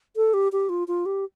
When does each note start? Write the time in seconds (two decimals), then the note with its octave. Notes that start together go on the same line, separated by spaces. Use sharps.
0.16 A4
0.34 G4
0.52 G4
0.69 F4
0.88 F4
1.06 G4